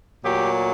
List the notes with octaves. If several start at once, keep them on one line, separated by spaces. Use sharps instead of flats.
A#2 F#3 A3 G4